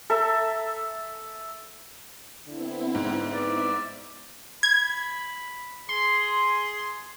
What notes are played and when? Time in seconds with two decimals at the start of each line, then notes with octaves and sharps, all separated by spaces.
0.10 A4 E5 A#5
2.47 D3 B3 C4 E4
2.95 G#2
3.33 B3 D5 E5
4.63 B5 G#6
5.89 G#4 C6